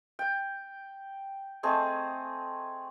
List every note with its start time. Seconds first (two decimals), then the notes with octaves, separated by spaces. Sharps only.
0.19 G5
1.63 A3 C4 G#4 D#5